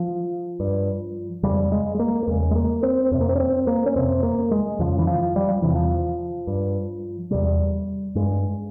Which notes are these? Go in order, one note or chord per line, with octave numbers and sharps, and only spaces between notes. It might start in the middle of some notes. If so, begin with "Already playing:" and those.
Already playing: F3
G2
F2 C#3 G3
G#3
G#3
A#3
A#3
E2 C#3 G#3
G#3
A#3
C4
F2 C3 C4
A#3
C4
C#4
C4
A#3
C#4
F2 C3 C4
A#3
G#3
F2 C#3 F3
E3
F3
G3
F3
E2 C3 E3
F3
G2
E2 C3 G3
G2 G#3